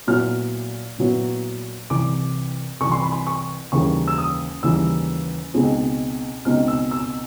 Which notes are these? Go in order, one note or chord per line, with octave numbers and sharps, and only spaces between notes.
A#2 F#3 B3 E4 F6
A#2 F#3 B3 E4
C2 C3 E3 D6
C2 C3 E3 C#6
C6
B5
C6
C#6
D#2 C#3 E3 G3 A#3 C#6
E6
D#6
D#2 C#3 E3 G3 A#3 E6
C#2 B2 G#3 C4 D#4
C#2 B2 G#3 C4 D#4 F6
E6
E6